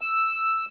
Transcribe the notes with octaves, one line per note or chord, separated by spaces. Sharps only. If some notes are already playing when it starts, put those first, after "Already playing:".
E6